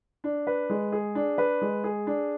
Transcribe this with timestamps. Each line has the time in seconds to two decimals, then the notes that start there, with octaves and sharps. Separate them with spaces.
0.24 D4
0.47 B4
0.70 G#3
0.92 G#4
1.15 D4
1.38 B4
1.62 G#3
1.84 G#4
2.07 D4